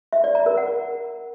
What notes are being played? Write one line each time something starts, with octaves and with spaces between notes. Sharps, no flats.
E5
D5
A#5
A#4
F#5